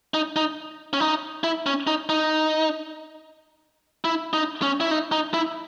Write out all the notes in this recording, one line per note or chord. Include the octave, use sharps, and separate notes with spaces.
D#4
D#4
C#4
D#4
E4
C#4
D#4
D#4
E4
D#4
C#4
E4
D#4
D#4
E4